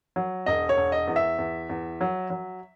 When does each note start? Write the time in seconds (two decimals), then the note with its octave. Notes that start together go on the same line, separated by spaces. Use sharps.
0.16 F#3
0.46 E1 D#5
0.69 C#5
0.77 E1
0.92 D#5
1.07 E2
1.16 E5
1.38 E2
1.69 E2
2.01 F#3
2.30 F#3